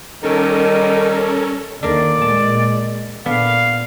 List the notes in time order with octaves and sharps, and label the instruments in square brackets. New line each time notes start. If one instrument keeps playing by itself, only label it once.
[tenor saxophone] D#3 [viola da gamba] G3 D#4 [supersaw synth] C#4 A4 A#4
[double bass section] D#2 D#3 [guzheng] A#3 D4 [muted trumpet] D5
[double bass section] A#2 G#3 [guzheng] A5
[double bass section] A#2 [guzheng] B3 D4 [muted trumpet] F5